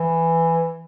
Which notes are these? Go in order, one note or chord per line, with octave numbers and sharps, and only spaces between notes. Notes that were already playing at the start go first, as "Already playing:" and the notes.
Already playing: E3